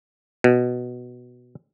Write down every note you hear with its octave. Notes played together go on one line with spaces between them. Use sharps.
B2